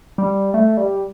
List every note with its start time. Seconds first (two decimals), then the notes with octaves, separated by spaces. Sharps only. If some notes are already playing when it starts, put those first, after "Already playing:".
0.18 G3
0.54 A3
0.77 G3